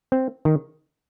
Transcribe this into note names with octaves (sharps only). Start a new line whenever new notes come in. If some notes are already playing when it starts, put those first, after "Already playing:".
C4
D#3